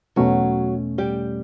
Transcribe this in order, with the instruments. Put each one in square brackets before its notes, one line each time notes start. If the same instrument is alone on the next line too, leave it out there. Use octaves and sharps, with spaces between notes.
[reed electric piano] E2 B2 A3 C#4 [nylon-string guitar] F#3 F#4
[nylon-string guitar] G3 G4